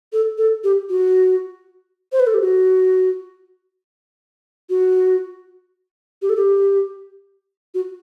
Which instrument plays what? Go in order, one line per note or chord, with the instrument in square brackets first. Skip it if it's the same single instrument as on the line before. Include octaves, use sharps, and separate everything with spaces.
[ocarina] A4
A4
G4
F#4
C5
B4
A4
G4
F#4
F#4
G4
A4
G4
F#4